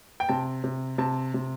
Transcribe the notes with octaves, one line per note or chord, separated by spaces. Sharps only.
G5
C3 A5
C3
C3 A5
C3